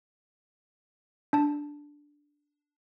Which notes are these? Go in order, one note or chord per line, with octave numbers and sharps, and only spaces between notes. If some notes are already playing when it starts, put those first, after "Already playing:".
D4 A5